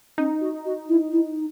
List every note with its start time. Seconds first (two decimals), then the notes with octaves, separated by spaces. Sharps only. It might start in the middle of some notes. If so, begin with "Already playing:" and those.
0.18 C#4 D#4
0.41 F#4
0.65 F#4
0.89 E4
1.12 E4